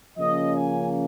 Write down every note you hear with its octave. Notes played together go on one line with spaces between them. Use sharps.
C#3 F3 A#3 C#4 D#5
G#5